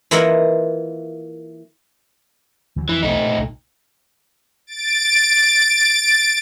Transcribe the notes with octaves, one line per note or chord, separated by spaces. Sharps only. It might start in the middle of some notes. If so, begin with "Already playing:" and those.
E3 A#3 E4 F4 D#5 F#5
D2 E3 F#3
F2 D#3 E3
B1 E2 A3 D#4
A#2
C2 A#2
A6 D7